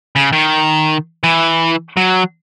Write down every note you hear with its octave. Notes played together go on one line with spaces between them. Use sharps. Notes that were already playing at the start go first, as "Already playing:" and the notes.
C#3
D#3
E3
F#3